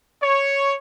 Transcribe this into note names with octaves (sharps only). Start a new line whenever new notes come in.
C#5